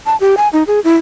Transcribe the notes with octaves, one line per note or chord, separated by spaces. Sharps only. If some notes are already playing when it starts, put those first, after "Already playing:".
A5
G4
G#5
D#4
G#4
E4